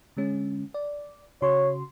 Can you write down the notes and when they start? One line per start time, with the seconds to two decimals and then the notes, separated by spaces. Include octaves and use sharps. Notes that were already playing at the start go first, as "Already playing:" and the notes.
0.17 D3 G#3 C#4
0.74 D5
1.42 C#3 F#4 C#5 C6